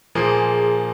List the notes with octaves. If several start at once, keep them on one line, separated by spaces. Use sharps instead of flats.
A#2 F3 A#3 G#4